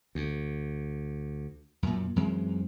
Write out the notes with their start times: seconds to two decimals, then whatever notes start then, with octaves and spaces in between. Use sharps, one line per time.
0.15 D2
1.83 F#2 A#2
2.16 F#2 E3 G#3 C4